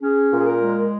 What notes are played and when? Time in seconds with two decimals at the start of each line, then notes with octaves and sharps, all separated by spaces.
0.02 C#4 G#4
0.32 A#2
0.39 G#4
0.47 A#4
0.62 G#3